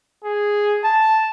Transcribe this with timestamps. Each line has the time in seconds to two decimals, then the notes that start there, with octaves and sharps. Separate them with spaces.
0.24 G#4
0.84 A5